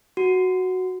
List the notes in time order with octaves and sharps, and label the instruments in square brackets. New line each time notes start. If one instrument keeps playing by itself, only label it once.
[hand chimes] F#4